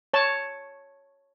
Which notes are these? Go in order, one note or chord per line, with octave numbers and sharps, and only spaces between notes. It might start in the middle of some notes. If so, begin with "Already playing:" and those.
C#5 A5